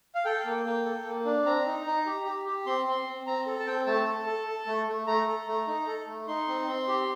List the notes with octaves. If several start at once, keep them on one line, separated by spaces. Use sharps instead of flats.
F5
A4 G5
A#3
A#3
A4
A#3
D4
C4 A#5
D#4
D#4
G4
G4
G4
C4 C6
C4
C4
C4 A#5
A4
A5
C4 G5
A3 A5
A4
A4
A4
A3
A3
A3 A#5
A4
A3
D#4
A4
A3
D#4 C6
C4
C4
G4